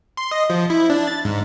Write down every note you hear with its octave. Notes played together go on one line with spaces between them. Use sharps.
C6
D#5
F3
E4
D4
A6
G#2